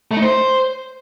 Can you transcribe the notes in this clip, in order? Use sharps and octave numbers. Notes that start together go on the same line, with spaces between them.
A3
D#4
C5